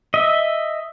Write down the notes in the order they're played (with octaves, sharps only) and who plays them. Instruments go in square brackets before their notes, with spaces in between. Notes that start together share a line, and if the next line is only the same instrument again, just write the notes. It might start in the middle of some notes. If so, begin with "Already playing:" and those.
[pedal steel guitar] D#5 E5